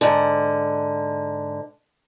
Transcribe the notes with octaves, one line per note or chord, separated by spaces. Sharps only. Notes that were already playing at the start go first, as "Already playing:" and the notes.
G#2 D3